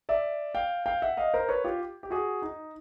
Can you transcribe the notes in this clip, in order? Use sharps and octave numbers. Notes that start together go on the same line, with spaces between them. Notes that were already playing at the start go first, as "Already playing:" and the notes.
D5 E5
F5 G5
F5 G5
E5 F#5
D#5 F5
A#4 C5
B4 C#5
F4 G4
G4
F#4 G#4
D#4